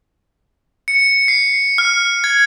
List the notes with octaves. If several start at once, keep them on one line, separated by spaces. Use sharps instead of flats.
C#7
C7
F6
G#6